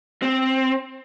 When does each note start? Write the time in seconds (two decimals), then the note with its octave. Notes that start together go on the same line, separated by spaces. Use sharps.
0.22 C4